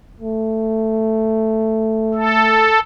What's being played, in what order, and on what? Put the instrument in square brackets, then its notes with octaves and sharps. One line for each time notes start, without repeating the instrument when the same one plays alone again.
[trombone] A3
[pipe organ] A4